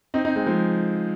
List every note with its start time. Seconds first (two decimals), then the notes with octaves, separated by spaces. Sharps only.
0.14 C4 D#4
0.25 C4 D#4
0.36 G#3 C4
0.46 F3 G#3